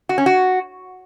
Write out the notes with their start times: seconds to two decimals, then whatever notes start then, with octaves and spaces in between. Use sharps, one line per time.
0.09 F#4
0.18 C#4
0.26 F#4